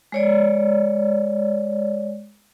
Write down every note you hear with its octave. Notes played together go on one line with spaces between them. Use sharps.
G#3 C#5 D5